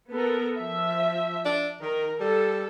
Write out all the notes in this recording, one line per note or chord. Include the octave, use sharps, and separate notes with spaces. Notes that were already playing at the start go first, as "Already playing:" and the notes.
B3 A4 A#4
F3 E5
D4
D#3 A#4
G3 A4